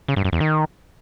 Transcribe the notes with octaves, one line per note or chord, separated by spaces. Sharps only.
C#3
G2
F#2
E2
D#3